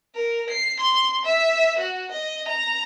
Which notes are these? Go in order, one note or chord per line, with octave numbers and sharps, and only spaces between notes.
A#4
C7
C6
E5
F#4
D#5
A#5